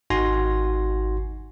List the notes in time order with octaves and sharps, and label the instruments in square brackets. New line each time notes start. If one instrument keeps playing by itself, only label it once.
[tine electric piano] G#1 D#4 F#4 G#5 C6 A#6